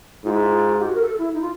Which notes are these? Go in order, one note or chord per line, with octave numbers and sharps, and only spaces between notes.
G#2 F4
E4
F4
G4
F#4
A#4
A4
E4
D#4
F4